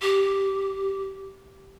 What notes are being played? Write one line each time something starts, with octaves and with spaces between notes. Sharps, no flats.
G4